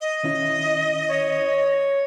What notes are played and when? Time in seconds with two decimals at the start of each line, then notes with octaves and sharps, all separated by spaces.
0.01 D#5
0.23 D#3 C#4 E4
1.09 C#5